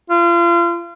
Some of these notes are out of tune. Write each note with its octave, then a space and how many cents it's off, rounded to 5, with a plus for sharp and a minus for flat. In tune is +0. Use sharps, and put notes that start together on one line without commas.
F4 -35